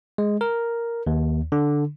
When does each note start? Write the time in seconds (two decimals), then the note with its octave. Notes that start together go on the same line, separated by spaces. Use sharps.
0.18 G#3
0.41 A#4
1.07 D#2
1.52 D3